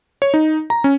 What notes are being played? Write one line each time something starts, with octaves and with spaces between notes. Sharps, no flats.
C#5
D#4
A#5
C#4